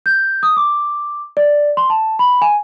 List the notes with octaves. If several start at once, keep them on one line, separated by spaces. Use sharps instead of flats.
G6
D#6
D6
D5
C6
A5
B5
G#5